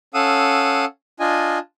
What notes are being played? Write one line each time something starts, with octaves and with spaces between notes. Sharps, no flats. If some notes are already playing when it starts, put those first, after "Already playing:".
C#4 A4 F5 F#5 D#6 E6
D4 F4 D#5 G#5